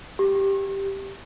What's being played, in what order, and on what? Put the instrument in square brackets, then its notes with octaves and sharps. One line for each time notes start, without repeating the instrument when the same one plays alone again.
[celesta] G4